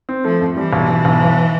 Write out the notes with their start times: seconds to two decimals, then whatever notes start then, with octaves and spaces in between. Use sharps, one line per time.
0.09 C4
0.24 F3 A3
0.41 F2
0.57 E3 G3
0.73 B1
0.89 B1
1.05 B1
1.21 G1